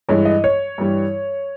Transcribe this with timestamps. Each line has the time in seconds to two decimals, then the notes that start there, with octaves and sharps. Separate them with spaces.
0.09 G2 E3 G#3 C#5
0.25 D#5
0.44 C#5
0.78 G2 E3 G3